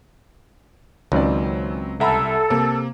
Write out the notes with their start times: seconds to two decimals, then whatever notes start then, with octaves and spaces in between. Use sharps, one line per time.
1.12 C#2 D#3 F#3 C4 C#4 D5
2.00 C2 A4 E5 F#5 A#5 B5
2.50 C3 A#3